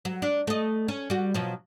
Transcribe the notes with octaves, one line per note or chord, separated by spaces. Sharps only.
F#3
D4
A3 D#5
C#4
G3 F#4
B2 F3 F#3